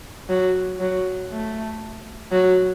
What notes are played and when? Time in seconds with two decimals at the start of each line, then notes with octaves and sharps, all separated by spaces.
0.29 F#3
0.80 F#3
1.32 A3
2.32 F#3